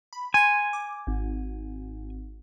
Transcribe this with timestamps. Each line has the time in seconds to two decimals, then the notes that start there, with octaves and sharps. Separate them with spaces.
0.13 B5
0.34 G#5 C6 G#6
0.73 D6
1.07 G#1